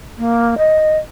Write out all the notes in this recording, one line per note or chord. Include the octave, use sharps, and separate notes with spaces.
A#3
D#5